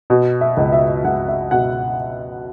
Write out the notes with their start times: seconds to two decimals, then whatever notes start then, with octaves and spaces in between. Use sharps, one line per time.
0.10 B2
0.41 E5
0.57 C#2
0.73 E5
1.04 C#2 F#5
1.28 E5
1.51 B2 F#5